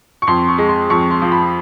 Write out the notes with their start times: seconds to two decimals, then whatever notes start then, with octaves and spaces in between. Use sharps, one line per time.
0.22 C#6
0.27 F2 C6
0.48 C#6
0.58 G#3
0.69 C6
0.90 F2 C#6
1.11 C6
1.22 F3
1.32 B5